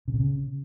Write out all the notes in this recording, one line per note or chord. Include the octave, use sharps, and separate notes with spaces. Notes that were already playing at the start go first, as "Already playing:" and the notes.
C#3
C3
C#3